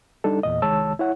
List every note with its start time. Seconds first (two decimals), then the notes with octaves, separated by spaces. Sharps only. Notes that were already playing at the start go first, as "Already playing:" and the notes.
0.24 G3 D4 D#4 A4
0.43 E2 A#2 D#5
0.62 C2 D#3 G#3 C#5 A5 E6
0.99 E4 C#5 F#5